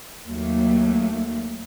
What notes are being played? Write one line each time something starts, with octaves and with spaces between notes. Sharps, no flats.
D#2 F#3 A3 A#3